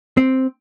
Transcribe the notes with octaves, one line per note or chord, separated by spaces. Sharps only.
C4